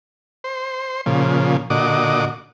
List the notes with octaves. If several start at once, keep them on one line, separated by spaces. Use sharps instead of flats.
C5
A#2 C#3 F3
A#2 D3 F#4 D#5 D6